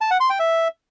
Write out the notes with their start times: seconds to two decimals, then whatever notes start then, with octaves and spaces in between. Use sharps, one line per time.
0.01 A5
0.11 F#5
0.20 C6
0.30 G5
0.39 E5